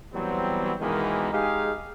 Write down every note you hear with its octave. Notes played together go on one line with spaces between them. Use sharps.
E3 F#3 G3 B3 C4
B2 D#3 E3 G#3 A#3 B3
G#3 D#4 G4 G#4 F5